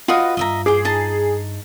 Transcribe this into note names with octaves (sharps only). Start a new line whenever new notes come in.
F4 F#4 B4 D#5
G2 D#5 E5 A#5
G#4 C5 D6
D#4 A5